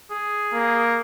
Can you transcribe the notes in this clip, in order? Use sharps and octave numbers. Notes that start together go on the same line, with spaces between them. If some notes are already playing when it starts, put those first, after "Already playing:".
G#4
A#3